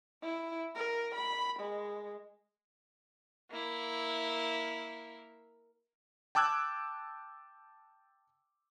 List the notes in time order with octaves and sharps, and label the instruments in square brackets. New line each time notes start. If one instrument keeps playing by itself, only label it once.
[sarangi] E4
A#4
B5
G#3
[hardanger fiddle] A#3 E4
[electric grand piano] G5 A5 D6 E6 F#6 G#6